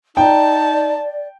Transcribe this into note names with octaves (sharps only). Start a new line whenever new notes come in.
D#4 D5 G5 A5